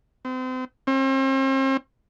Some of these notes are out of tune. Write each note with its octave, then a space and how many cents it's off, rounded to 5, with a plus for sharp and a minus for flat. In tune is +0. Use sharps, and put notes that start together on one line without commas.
C4 -35
C4 +40